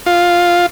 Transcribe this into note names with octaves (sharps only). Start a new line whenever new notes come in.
F4